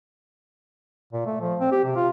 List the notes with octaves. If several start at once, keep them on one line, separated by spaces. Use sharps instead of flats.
A#2
A3
F3
C4
G4
C3
F4